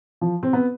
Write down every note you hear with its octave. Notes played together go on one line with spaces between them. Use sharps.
F3
C4
B3